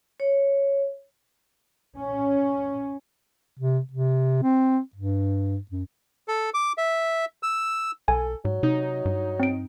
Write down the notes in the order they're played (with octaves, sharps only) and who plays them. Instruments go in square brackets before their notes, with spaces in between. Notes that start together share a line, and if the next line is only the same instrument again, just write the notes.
[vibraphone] C#5
[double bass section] C#4
[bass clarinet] C3
C3
C4
G2
F#2
[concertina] A4
D6
E5
E6
[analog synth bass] B1 [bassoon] A4 [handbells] G#5
[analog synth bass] G#2 [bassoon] F#3
[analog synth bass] C3 [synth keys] D#4
[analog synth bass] G2
[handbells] C4 D7